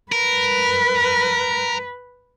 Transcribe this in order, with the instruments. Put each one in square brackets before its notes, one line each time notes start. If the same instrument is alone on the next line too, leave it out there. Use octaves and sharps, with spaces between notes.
[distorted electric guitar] A#4 [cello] B4